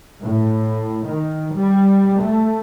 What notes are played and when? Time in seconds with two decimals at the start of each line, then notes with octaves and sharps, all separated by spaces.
0.24 A2
1.08 D#3
1.56 G3
2.22 A3